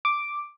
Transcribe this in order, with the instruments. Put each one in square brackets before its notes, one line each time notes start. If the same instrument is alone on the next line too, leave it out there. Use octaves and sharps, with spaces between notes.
[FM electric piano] D6